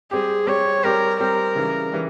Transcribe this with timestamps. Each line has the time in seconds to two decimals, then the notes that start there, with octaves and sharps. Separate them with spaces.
0.11 G3 C4 G4 G#4
0.47 G3 C4 G4 C#5
0.83 G3 C4 G4 A#4
1.19 G3 C4 G4 A#4
1.55 C#3 E3 G3
1.92 E3 G3